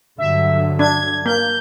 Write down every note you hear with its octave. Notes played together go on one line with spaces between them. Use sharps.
G2 D3 F#3 E5
D4 G#6
A#3 G6